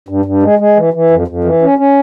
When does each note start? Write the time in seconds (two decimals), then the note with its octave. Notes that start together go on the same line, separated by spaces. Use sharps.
0.09 G2
0.25 G2
0.43 G#3
0.59 G#3
0.76 E3
0.93 E3
1.10 F2
1.27 F2
1.44 E3
1.62 C#4
1.78 C#4